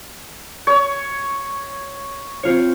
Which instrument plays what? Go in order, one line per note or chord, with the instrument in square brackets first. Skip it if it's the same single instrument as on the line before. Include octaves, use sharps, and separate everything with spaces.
[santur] C#5
[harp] C4 F4 C#5